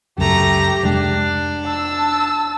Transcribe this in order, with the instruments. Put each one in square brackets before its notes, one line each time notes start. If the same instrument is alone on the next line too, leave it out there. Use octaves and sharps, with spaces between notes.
[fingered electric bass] C#2 F#2 [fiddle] A3 A#5 [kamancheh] G4
[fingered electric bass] F1 G#3 [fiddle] D4
[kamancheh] A5 E6